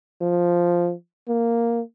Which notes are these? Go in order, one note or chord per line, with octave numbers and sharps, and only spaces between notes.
F3
A#3